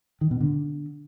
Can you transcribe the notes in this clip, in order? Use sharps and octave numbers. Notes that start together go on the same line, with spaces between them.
D#3
B2
D3